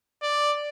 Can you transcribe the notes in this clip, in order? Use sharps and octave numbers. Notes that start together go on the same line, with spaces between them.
D5